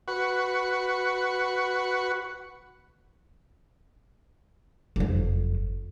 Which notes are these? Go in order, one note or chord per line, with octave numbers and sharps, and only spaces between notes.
F#4 B4 F#5 C#6
F#1 F2